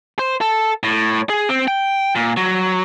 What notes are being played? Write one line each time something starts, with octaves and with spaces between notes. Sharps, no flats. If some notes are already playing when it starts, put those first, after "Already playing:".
C5
A4
A2
G#4
C4
G5
A#2
F#3